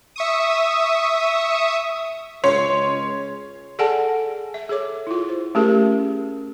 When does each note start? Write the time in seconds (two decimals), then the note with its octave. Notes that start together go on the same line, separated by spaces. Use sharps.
0.16 E5 C#6 D#6
2.44 C#2 C#4 C#5 C6
3.79 G#4 A4 D5 F#5 G#5 A5
4.54 E5
4.69 G#4 A4 C#5 D6
5.07 E4 F4
5.29 C5
5.55 A3 C#4 G4 G#4 A#4